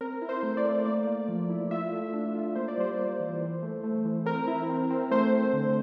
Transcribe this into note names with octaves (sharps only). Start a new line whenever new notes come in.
C4 A#4
E4
C5
A3
D5
A3
A#3 D5
A#3
F3
E4
F4 E5
A3
D4
F4
A#3 C5
D5
G3 C5
A#3
E3
E3
A3
A3
E3
C4 A#4
E4
C4
C4
A3 C5
A3
D3